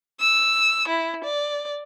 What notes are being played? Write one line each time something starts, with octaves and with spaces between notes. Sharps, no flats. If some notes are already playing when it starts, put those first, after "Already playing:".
E6
E4
D5